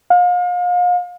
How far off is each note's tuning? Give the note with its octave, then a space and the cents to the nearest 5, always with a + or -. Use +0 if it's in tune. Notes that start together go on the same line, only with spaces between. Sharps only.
F5 +35